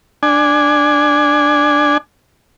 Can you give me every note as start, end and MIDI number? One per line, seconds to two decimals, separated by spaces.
0.23 1.98 62
0.23 1.98 80